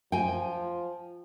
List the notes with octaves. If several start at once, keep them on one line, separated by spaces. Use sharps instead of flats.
F3 G5 G#5